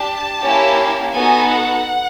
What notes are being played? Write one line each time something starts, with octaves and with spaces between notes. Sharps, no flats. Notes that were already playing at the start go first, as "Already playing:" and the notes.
Already playing: D4 G4 A5
A#3 C#4 E4 G4
B3 D#4 F#4 A4 G#5
F#5